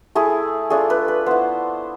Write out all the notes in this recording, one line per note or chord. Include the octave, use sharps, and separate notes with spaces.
A3 E4 G#4
A3 D4 F4 G#4
B4
B4
B3 E4 C5